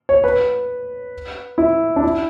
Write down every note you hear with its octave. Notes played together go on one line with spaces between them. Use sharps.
C#5
B4
E4
D4
E4